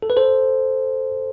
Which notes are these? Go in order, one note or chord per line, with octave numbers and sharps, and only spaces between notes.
A4
B4
A4 C5